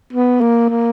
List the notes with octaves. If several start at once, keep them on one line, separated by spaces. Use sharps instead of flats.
B3
A#3
A#3